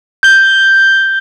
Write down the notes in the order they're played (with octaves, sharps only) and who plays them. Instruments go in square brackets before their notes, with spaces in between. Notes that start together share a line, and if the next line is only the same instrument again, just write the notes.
[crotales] G6 G7